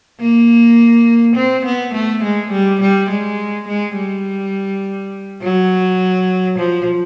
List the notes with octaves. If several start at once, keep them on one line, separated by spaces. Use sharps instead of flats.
A#3
C4
B3
A3
G#3
G3
G3
G#3
G#3
G3
F#3
F3